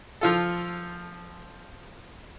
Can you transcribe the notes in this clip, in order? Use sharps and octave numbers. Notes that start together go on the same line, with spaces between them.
F3 F4 A4